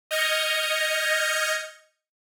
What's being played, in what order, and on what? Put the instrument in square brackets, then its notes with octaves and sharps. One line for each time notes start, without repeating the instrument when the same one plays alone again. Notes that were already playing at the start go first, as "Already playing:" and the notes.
[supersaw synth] D#5 F6 G6 G#6 A#6 C#7